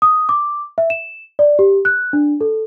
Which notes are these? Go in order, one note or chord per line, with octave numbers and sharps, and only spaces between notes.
D#6
D6
E5
E7
D5
G4
F#6
D4
A4